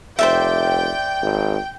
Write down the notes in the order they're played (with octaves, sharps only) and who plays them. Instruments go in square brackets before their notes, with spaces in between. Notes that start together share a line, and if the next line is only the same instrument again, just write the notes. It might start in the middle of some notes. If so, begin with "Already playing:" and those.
[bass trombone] F1 [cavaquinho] C5 D5 E5 [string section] G5
[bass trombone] G#1